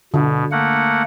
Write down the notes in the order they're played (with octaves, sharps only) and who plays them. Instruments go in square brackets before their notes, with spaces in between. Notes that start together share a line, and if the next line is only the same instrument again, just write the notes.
[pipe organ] B2 [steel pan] D3
[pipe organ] A3 A#3 F#5